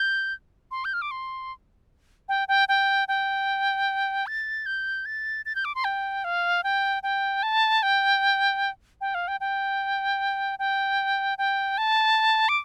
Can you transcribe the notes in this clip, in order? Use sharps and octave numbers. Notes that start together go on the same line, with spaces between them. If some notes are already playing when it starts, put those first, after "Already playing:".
Already playing: G6
C6
G6
F6
D6
C6
G5
G5
G5
G5
A6
G6
A6
A6
G6
D6
C6
G5
F5
G5
G5
A5
G5
G5
F5
G5
G5
G5
G5
A5
D6